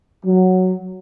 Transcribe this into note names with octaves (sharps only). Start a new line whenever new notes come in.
F#3